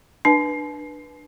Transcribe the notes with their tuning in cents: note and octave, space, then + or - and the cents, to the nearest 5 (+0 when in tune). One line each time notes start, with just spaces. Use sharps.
D4 +20 B4 -15 A5 -45